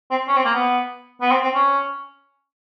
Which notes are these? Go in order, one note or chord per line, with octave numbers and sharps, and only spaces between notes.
C4
C#4
C4
A#3
B3
B3
C4
C4
C#4